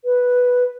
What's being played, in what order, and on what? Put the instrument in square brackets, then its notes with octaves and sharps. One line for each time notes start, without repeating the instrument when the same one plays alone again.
[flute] B4